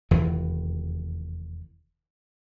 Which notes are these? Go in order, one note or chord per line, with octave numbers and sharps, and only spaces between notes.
F1 E2 D#3 E3